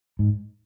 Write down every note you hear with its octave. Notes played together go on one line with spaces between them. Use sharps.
G#2